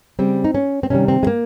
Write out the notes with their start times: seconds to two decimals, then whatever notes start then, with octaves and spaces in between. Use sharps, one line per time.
0.19 C#3 G3 C4
0.44 D#4
0.55 C#4
0.83 C4
0.90 C3 D#3 G3 C#4
1.08 C4
1.23 G#3
1.27 A#3